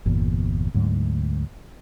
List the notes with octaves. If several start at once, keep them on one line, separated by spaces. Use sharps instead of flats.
G1 E2 A#2
D2 G#2 F#3